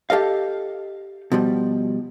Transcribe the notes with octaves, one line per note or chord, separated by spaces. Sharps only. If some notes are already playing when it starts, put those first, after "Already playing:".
G4 A4 D#5 F5
B2 F3 G3